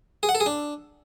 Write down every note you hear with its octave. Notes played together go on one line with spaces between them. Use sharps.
G#4
F#5
A4
G#4
D4